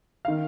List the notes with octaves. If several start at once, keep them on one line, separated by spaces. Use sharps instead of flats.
D#3 F5